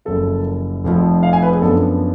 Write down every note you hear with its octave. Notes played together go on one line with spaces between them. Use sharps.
F#1 F#2 F3 A4
F1 F2 F3
F5
G#5
B4
G#4
F#2 F3 B3 D4 A4